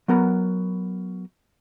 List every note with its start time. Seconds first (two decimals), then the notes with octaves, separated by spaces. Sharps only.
0.08 F#3 B3 A#4 A#5